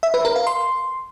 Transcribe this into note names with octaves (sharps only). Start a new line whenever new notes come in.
E5
B4
A#4
F5
C6